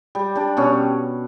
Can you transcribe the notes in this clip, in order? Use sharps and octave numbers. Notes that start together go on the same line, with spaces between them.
G3
G3 D4
B2 C#4